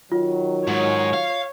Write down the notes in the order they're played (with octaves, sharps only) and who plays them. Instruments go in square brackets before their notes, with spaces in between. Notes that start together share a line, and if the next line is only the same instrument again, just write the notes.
[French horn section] D#3 F#3 [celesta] F4
[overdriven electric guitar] G#2 [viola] C#5
[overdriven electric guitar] F5